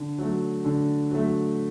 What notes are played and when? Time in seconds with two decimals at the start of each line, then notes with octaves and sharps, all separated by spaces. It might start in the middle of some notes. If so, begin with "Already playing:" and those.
Already playing: D3
0.18 F#3 A3
0.65 D3
1.11 F#3 A3